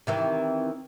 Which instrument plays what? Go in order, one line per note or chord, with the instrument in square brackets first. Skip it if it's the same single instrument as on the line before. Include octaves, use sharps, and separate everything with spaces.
[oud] C3 D#3 E3